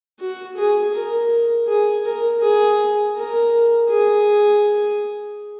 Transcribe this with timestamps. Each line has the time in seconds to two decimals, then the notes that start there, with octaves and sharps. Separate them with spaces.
0.20 F#4
0.57 G#4
0.94 A#4
1.68 G#4
2.05 A#4
2.41 G#4
3.16 A#4
3.89 G#4